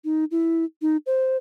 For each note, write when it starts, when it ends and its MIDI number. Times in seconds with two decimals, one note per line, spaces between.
0.04 0.25 63
0.31 0.64 64
0.82 0.97 63
1.06 1.37 72